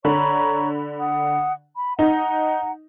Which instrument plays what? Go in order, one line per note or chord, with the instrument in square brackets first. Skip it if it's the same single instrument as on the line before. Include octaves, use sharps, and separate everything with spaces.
[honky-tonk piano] D3 B5 [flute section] C#5 A#5 C#6
[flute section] F#5 D#6
B5
[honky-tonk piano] D#4 [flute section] F#5 A#5